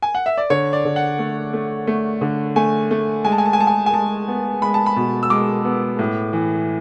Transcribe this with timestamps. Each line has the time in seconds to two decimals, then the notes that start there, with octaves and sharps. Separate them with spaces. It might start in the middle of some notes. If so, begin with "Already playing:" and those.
0.02 G#5
0.15 F#5
0.26 E5
0.38 D5
0.50 D3 C#5
0.73 D5
0.85 D3
0.96 F#5
1.19 A3
1.53 A3
1.87 A3
2.21 D3
2.56 A3 G#5
2.91 A3
3.25 G#3 G#5
3.32 A5
3.38 G#5
3.46 A5
3.53 G#5
3.59 G#3 A5
3.67 G#5
3.86 G#5
3.93 G#3 A5
4.28 B3
4.62 G#3 B5
4.74 A5
4.86 B5
4.96 B2
5.23 E6
5.30 G#3 D6
5.65 B3
5.99 A2
6.33 E3